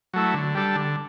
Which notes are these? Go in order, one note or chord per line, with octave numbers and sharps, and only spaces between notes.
F#3 A3 E4
D3
G3 D4 A4
D3